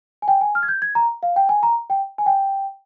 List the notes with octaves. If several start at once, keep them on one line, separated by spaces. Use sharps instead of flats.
G#5
G5
G#5
F6
G#6
G6
G#6
A#5
F5
G5
G#5
A#5
G5
G#5
G5